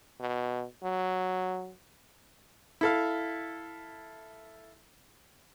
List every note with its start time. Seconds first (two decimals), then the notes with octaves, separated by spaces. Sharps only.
0.20 B2
0.83 F#3
2.81 E4 A4 F5